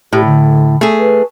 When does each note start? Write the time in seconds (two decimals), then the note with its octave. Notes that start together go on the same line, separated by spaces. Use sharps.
0.13 A2 G4
0.25 D3
0.81 A3 G#4
0.99 B4